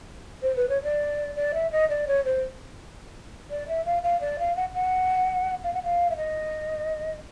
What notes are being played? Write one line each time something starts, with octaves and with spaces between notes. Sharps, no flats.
C5
B4
C#5
D5
D5
E5
D#5
D5
C#5
C5
D5
E5
F5
F5
D5
F5
F#5
F#5
F5
F#5
F5
E5
D#5